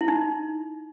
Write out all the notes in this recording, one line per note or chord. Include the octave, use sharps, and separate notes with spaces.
E4
D#4